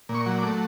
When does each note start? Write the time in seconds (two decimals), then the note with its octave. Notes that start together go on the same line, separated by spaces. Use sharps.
0.09 A#2
0.15 C#6
0.26 F#3
0.38 D6
0.43 A3